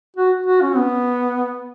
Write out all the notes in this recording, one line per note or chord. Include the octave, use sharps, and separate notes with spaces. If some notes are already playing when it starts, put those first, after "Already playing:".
F#4
F#4
C#4
B3